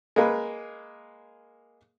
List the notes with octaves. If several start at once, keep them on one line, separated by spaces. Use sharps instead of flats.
G#3 A#3 B4